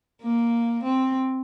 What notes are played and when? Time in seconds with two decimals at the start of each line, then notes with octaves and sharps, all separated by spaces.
0.22 A#3
0.83 C4